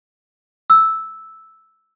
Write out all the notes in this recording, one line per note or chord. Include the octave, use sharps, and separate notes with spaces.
E6